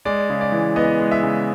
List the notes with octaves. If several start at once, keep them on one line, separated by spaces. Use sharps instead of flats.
G#3 D5
C#3
D5
E3
B3 D#5
G#3
E5
C#3